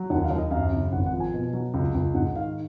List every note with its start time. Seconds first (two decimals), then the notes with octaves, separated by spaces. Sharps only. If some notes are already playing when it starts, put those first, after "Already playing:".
Already playing: F#3
0.10 D#2 F#5
0.24 F5
0.30 D#2
0.38 D#5
0.51 F#2 F5
0.72 C#3
0.92 G#1 F#5
1.06 F#5
1.13 F3
1.20 G#5
1.34 B2
1.53 F#3
1.74 C#2
1.95 C#2
2.15 G#2 F#5
2.35 D#3 F5